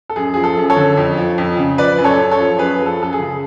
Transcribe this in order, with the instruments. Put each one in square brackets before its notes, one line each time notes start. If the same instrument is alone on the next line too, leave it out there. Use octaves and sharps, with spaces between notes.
[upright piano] A4
F#2 G#4
F3 G#4
A4
F#2
A4 C#5
D3
F2
F3
F2
C#3
F3 B4 D5
F#2
A4 C#5
F#2
A4 C#5
F3
F#2 G#4 B4
F3
A4
F#2 A4
G#4
C#3